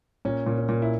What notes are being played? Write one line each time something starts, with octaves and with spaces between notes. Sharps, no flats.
A#2 C#4
A#2
C#4
A#2
E4